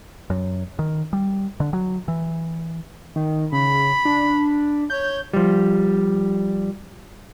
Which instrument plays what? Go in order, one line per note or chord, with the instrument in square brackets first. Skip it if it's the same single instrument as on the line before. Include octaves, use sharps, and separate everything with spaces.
[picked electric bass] F#2
D#3
G3
D3
F#3
E3
[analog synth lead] D#3
[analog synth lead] C#3 [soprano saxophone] B5
[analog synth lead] D4
[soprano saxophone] C#5 [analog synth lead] G6
[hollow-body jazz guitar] F3 G3